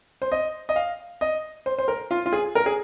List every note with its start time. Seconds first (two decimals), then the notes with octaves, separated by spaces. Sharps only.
0.22 C5
0.32 D#5
0.69 D#5
0.76 F5
1.21 D#5
1.66 C5
1.78 C5
1.88 A#4
2.11 F4
2.26 F4
2.33 G#4
2.55 A#4
2.66 G#4